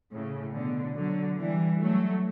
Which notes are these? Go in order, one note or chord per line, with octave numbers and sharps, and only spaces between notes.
A2 C#3
B2 D3
D3 F#3
E3 G3
F#3 A3